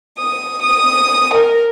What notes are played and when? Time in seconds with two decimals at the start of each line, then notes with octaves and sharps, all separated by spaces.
0.18 D#6
0.63 D#6
1.33 A#4